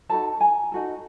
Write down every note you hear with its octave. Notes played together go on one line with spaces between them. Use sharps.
D#4 F#4 A4 A5 B5
G#5 A#5
D#4 F#4 A4